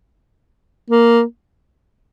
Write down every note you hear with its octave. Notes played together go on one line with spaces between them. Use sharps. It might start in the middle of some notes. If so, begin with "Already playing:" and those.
A#3